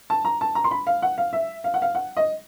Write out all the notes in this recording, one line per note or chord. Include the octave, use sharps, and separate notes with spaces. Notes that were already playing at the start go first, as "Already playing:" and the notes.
A5
A#5
A5
A#5
C6
B5
F5
F#5
F5
E5
F5
F#5
F5
F#5
D#5